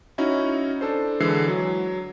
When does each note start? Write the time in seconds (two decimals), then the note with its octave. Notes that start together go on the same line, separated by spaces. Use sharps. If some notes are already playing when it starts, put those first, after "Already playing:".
0.18 C#4 D#4 E4 F#4
0.81 D4 A4 C5
1.20 D3 E3 G#3 E6 C7
1.48 F#3